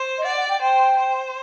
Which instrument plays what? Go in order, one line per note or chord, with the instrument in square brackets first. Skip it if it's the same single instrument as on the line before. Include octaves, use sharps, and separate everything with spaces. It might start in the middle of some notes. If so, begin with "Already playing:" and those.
Already playing: [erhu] C5
[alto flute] D#5
[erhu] D5 [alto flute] F#5
[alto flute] F#5
G5
[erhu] C5 [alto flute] G5
[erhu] C5